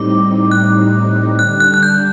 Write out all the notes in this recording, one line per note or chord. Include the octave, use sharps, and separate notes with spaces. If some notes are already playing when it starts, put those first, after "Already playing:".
Already playing: A2 G3 C4 D#4 D6
F#6
D3 G3 D4 F#6
F#6
F#6
G6